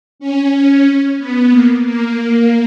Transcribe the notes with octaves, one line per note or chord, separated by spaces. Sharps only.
C#4
C#4
B3
A#3
A#3